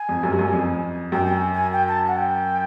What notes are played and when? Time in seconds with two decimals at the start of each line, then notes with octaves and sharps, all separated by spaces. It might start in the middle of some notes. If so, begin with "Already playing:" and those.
Already playing: G#5
0.09 F2
0.23 F#2
0.31 G2
0.39 F#2
0.53 F2
1.12 F#2 G5
1.25 G5
1.33 G#5
1.53 G#5
1.73 G5
1.88 A5
2.07 F#5
2.17 G5